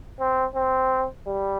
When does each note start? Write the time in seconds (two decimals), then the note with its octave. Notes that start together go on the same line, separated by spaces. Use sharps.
0.20 C4
0.55 C4
1.27 G3